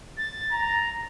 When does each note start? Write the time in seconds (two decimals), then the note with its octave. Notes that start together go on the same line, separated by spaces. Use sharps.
0.17 A6
0.52 A#5